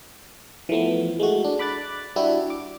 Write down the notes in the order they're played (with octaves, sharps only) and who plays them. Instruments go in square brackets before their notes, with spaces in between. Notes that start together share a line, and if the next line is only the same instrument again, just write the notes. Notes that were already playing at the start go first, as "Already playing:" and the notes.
[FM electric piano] E3 F3 A3 B3
G#3 A3 F#4
D4
B5 D6 F#6 A6
G3 D4 E4 F#4 G4
D6